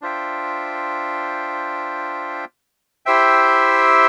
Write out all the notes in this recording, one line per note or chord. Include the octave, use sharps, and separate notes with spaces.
D4 F4 C5 E5 G5
E4 G4 C5 E5 G5